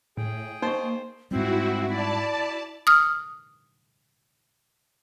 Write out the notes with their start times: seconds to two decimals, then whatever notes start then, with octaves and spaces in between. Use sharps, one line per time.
0.17 A2 G#4 G5
0.62 A#3 D#4 C5 D#5 C#6
1.31 G#2 G3 C4 E4 F#4
1.88 E4 D5 A5
2.87 D#6 F6